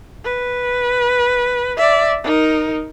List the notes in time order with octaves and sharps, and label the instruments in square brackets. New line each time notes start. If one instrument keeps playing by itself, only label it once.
[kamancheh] B4
D5 E5
D#4 A#4